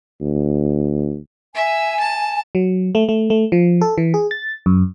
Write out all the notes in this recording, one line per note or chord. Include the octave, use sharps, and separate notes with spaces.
D2
E5 G#5
A5
F#3
A3
A3
A3
F3
A4
E3
G#4
A6
F#2